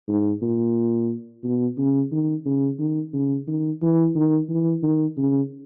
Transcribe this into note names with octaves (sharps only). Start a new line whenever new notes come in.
G#2
A#2
B2
C#3
D#3
C#3
D#3
C#3
D#3
E3
D#3
E3
D#3
C#3